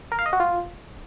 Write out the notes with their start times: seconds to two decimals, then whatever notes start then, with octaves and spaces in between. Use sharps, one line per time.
0.12 A#4
0.19 F5
0.26 D#5
0.33 F#4
0.40 F4